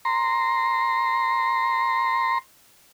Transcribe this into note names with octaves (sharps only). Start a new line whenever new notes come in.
A#5 C6